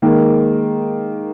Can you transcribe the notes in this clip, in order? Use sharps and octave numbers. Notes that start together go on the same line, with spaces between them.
D#3 G#3 A#3